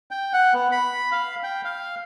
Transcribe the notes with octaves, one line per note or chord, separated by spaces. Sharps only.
G5
F#5
B3
B5
F5
G5
F5